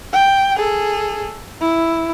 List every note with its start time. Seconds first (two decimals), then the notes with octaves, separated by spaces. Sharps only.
0.13 G5
0.56 G#4 A4
1.61 E4